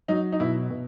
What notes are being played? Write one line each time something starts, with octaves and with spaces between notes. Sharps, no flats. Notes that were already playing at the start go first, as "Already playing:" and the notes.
F#3 D#4
D#4
B2 E4
B2